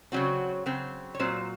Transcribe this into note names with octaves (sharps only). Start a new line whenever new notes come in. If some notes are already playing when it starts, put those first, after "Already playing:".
C#3 F#3 C4 F#4
C#3 F#3 C4
C#5
A#2 F#3 C4 C5